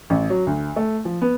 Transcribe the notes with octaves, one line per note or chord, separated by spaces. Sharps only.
A1
F#3
D2
A3
F3
B3